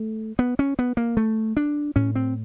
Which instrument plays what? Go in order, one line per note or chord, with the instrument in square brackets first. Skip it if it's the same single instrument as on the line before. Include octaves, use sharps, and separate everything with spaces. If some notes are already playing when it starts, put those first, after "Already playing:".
Already playing: [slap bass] A3
B3
C#4
B3
A#3
A3
D4
A2 C#4
C4